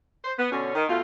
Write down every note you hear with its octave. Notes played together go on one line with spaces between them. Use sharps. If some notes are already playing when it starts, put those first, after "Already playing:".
C5
B3
B2 D3 C#4
D#3
B2 A3 F4